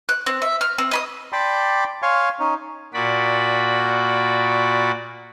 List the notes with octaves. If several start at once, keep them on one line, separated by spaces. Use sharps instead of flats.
F#6
C4
E5
F6
C4
D#5 B5 D#6
D5 G5 A5 B5 C6 D6
C#5 F5 G#5 C6 C#6
C#4 D#4
A#2 F#4 D5 B5